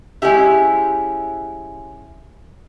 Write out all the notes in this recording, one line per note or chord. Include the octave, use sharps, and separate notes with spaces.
G#3 A3 C#4 E4 G4 E5